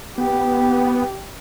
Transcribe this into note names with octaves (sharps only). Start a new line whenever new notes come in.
B3 G4